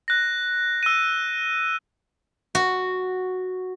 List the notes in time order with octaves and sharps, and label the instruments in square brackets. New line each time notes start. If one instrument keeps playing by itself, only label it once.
[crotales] F#6 A#6
E6 D#7
[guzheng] F#4